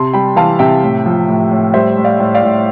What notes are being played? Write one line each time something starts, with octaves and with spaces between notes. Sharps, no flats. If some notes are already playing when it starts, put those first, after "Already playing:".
Already playing: C3 A5 C6
G3 G5 B5
E3 F5 A5
C3 E5 G5
A2
F3
A2
A2
G3 C5 E5
A2
D5 F5
A2
D5 F5
A2